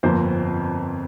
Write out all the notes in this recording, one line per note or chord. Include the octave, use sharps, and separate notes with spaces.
G1 F2 F3 A#3 C5